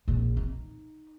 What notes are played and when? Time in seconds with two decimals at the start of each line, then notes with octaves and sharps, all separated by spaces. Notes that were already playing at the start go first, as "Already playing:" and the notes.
0.08 A#1 D3
0.37 D#4